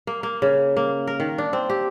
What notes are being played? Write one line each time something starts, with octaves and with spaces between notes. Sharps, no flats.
A#3
A#3
C#3
A#3
A#4
D#3
D4
C4
G4